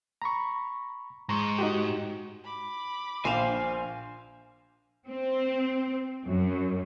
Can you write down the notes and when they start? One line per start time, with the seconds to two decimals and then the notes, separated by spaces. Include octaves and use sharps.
0.22 A#5 B5 C#6
1.29 G#2 A#5 C6 C#6
1.59 D#4 F#4 G4
2.44 B5 D6
3.25 A#1 C5 F5 G#5
5.08 C4
6.26 F#2